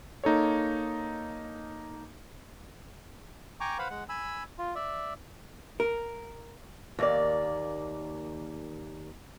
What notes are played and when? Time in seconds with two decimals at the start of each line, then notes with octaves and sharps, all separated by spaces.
0.24 A#3 D#4 A4 C#5
3.60 G5 G#5 A#5 C#6 D6
3.78 B4 C5 F5 F#5 B5
3.90 G#3 F#5
4.09 G#5 B5 E6
4.58 F4
4.75 D5 E5
5.80 A#4
6.99 D#2 A#3 D5